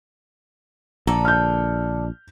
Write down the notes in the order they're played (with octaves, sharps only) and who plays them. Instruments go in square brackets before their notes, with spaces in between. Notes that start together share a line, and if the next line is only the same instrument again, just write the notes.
[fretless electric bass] A#1 [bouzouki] D3 A4 [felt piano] A#5
[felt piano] F6 G6